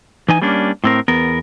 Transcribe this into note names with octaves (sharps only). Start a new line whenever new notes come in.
E3 D#4 G#5
G3 A#3 C#4 D4
A2 C4 A#4
E2 B3 A#4